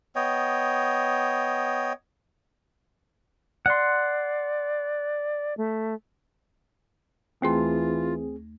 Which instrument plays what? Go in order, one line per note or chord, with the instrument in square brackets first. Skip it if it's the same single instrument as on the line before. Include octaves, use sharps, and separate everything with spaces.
[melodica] B3 C#5 D#5 G5
[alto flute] D5 [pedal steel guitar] F#5 C6
[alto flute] A3
[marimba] D#2 A3 C6 [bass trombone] E3 [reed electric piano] C4 G#4 [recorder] F4